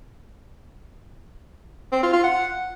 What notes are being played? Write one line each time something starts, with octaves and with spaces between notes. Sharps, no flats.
C4
F4
F4
F#5